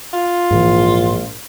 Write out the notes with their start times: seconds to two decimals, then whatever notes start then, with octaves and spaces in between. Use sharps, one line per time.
0.13 F4
0.51 A#1 G#2 E3